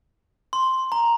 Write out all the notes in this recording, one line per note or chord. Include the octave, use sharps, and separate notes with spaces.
C6
A#5